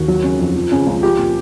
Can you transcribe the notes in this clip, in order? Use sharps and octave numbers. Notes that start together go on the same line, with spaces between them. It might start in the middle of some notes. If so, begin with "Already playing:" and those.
Already playing: D#2 F#4
F#3
C#3
F2
F3
C#3
C#2
F3 G4
A#2